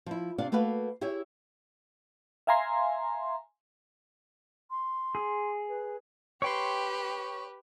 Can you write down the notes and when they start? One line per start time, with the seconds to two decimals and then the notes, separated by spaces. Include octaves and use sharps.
0.06 F3 E4
0.38 C3 D4 D5 F5
0.52 A3 A#3 F#4 B4 F5
1.01 E4 G4 G#4 C#5 E5
2.47 E5 F5 G#5 A#5 C6
4.70 C6
5.15 G#4
5.68 B4
6.42 G4 B4 C#5 G5 C6